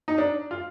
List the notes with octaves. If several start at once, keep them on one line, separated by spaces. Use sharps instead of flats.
D#4
D4
F4